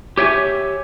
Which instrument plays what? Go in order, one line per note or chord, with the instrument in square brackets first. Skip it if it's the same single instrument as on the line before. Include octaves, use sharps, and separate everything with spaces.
[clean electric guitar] G4 C#5 E5 G5 G#5